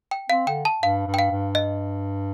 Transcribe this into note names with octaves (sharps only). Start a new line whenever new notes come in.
G5
C4 F5
D3 G5
A5
G2 F5
G2
G5
F5
G2
D#5